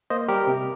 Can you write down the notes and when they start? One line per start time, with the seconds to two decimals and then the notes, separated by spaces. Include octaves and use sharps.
0.10 A#3 C5 D#5
0.28 G3 G4 A#4
0.47 C3